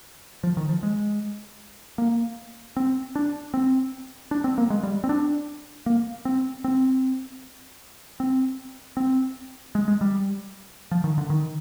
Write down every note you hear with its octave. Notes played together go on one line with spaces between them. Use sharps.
F3
D#3
F3
G#3
A#3
C4
D4
C4
D4
C4
A#3
G#3
G3
C4
D4
A#3
C4
C4
C4
C4
G#3
G#3
G3
F3
D#3
D3
D#3